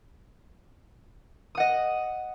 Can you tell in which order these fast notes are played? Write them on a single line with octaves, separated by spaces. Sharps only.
D#6 F#5 D#5